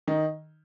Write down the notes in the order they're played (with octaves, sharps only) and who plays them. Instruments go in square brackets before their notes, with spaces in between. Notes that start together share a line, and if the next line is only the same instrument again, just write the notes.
[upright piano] D#3 D#4